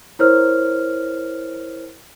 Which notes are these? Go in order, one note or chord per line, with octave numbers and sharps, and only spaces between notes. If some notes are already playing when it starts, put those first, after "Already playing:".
E4 A#4 C5 C#5 F6